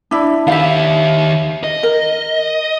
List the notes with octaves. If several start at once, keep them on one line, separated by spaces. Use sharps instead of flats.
D4 E4
D#3 G4 E5 F5
D#5
A#4